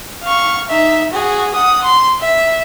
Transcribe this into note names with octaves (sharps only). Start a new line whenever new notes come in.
F5 C#6
D#4 E5
F#4 G#4
F#5 D#6
C6
E5